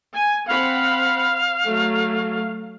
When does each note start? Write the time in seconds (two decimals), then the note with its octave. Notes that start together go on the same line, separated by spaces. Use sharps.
0.13 G#5
0.47 C4 F5 F#5 B5
1.64 F#3 A3